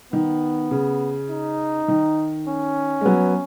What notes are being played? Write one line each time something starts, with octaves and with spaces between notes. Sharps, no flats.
D#3 B3
C#3
D#4
D#3
C#4
G#3
F#3 B3